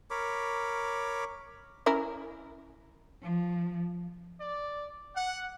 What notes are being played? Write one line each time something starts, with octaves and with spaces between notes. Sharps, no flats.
A#4 C#5 B5 D6
C#4 E4 A#4
F3
D5
F#5